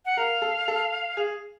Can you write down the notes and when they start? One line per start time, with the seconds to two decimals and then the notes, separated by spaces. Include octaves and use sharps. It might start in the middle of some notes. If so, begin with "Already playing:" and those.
0.05 F#5
0.17 A#4 F5
0.42 A4
0.68 A4
1.17 G#4